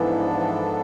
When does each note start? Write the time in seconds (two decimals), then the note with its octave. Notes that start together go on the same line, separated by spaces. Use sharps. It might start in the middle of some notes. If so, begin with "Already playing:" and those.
Already playing: G#2 E3 F3 B3 D4 A4
0.33 E3